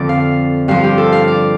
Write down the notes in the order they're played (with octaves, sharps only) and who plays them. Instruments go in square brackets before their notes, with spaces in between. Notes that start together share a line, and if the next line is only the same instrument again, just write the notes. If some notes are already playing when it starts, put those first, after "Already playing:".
Already playing: [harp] F2 D3 F3 D5
F5
G2 F3 F5
F4
G4
A4
F5
D5